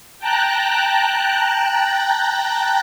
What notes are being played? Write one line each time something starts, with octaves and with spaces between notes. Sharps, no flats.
G5 A5 A#5 F#6